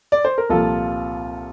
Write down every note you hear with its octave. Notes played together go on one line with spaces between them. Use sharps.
D5
C5
A#4
C2 A#2 F3 F4 A4